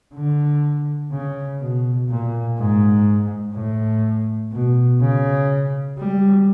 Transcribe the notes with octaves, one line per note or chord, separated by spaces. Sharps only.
D3
C#3
B2
A#2
G#2
A2
B2
C#3
G3